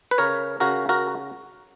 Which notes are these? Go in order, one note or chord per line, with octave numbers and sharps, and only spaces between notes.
B4
C#3 A#4 C#5
C#3 F#4 A#4
F#4 A#4